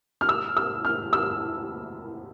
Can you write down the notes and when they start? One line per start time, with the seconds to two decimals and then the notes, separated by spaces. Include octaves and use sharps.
0.21 F6
0.29 E6
0.57 E6
0.85 F6
1.13 E6